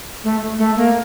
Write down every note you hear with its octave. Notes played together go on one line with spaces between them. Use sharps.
A3
A3
A#3